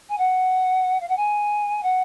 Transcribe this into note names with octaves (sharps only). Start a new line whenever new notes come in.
G#5
F#5
F5
F#5
G#5
F#5